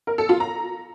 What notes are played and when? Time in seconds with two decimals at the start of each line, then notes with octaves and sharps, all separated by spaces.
0.07 A#4
0.18 A4
0.29 F4
0.40 A#5